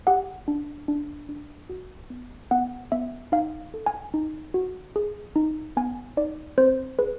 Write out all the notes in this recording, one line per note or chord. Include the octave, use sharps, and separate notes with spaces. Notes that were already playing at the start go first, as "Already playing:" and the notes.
G4 F#5
D4
D4
D4
F#4
B3
B3 F#5
B3 E5
D#4 F5
A4
G#5
D#4
F#4
G#4
D#4
B3 G#5
D#4 D5
C4 C5
G#4 B4